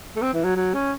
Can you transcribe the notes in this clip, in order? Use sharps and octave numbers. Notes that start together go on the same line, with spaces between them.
A3
C4
E3
F#3
F#3
C#4